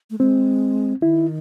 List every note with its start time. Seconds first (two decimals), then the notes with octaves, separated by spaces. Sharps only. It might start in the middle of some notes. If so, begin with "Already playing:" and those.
0.10 A3
0.19 G#3 C4
1.02 D#3 E4